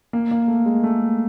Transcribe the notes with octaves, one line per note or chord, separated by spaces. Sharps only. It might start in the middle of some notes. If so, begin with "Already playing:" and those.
A#3
A#3
A3
G#3
A3